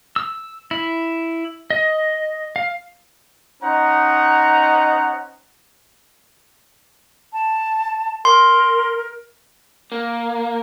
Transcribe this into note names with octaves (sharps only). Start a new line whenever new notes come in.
E6
E4
D#5
F5
C#4 D#4 C5 D#5 F#5 A#5
A5
A#4 C6
A#3